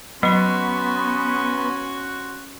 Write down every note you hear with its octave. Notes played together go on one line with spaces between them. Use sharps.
F#3 B3 C#4 F#4 B5 C6